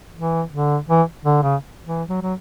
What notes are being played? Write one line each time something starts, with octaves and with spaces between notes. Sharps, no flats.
E3
D3
E3
D3
C#3
E3
F#3
F#3